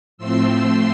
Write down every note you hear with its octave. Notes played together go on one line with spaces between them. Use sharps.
A2 F3 A3 C4 C6 E6